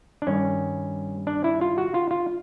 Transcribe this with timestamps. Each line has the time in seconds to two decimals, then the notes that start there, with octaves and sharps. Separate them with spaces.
0.22 D4
0.27 G2 D#3 G3 C#4
1.27 D4
1.44 E4
1.61 F4
1.78 F#4
1.94 F4
2.11 F4